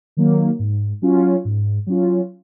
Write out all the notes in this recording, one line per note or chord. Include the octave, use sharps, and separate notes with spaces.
D#3 F#3 A#3
G#2
F#3 C#4 F4
G#2
F#3 C#4 F4